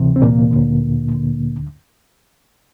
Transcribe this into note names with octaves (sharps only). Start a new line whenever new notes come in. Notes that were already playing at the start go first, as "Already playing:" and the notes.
Already playing: D2 C3 E3
C4
A#2 A#3
D2 D3
D2 D3